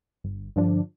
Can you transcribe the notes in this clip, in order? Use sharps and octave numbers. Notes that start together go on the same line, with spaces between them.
G1
G2 D3 F3 D4